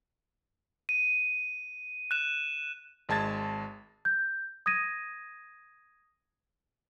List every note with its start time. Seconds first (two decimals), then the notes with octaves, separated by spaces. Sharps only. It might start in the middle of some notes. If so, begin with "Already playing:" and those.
0.89 D#7
2.11 F#6 E7
3.09 G#1 G#3 A5 G#6 A6
4.05 G6
4.66 D#6 G#6 A#6 D#7